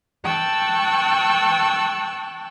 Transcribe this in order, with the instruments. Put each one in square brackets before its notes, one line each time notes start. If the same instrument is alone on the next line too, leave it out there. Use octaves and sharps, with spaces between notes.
[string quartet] G5 A5 C#6 E6 F#6